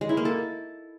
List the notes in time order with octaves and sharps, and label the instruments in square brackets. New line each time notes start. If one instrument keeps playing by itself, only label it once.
[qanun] G#3
E4
A#3
A4